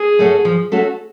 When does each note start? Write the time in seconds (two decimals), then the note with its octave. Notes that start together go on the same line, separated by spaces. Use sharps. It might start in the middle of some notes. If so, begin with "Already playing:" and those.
Already playing: G#4
0.19 A3 C#4 F#4 A4
0.45 F3
0.72 A3 C#4 F#4 A4